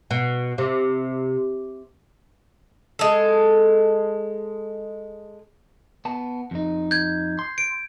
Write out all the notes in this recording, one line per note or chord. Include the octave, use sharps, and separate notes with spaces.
B2
C3
G#3 A4
B3 A5
F2 D#4
G6 G#6
C6
D7